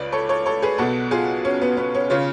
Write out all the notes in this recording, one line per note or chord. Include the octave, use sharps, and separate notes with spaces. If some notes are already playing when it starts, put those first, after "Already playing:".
Already playing: C#2 C#3 B4 D5
A4 C#5
A4 C#5
A4 C#5
G#4 B4
B1 B2 F#4 A4
F4 G#4
C#4
B3
B3
C#4
C#3 C#4 F4